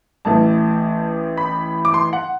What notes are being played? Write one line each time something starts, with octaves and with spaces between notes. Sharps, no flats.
A1 A2 E3 A5
B5
D6
C6
F#5